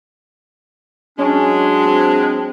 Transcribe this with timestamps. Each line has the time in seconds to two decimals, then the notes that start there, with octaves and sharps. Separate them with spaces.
1.18 F#3 G#3 C#4 D4
1.85 C4